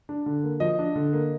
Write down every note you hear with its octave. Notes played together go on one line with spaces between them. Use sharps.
D4
D3
A#3
F3 D#5
D4
D3
A#3